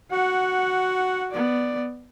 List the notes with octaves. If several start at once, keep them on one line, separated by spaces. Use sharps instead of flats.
F#4 F#5
B3 D5